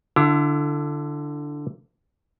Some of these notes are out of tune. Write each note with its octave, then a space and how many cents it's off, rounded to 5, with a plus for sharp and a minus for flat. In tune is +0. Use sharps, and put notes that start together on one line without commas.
D3 +0 E4 +30 F5 +0